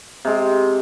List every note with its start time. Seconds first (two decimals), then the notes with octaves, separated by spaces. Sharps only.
0.25 C3 G#3